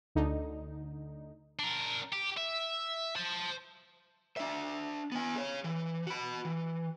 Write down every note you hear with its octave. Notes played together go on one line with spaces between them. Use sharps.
D2 D3 D#4
D4 A#4
G4
E5
C5 A5
D4 E5
B3 G#5
G#4 C#5
E3
F#4 B5
E3